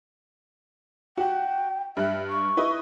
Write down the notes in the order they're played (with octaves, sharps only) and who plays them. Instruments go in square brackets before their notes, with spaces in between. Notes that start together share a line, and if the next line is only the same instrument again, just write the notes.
[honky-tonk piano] F#4 F#5 [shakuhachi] G5
[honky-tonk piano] G2 F#6 [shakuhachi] E5
[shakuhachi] C#6
[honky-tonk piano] E4 B4 D#5